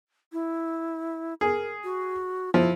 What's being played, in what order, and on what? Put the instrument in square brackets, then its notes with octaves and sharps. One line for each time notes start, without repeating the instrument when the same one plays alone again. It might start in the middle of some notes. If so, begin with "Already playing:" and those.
[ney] E4
[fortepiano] G#4 [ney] A#4
[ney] F#4
[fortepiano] F3 [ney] E4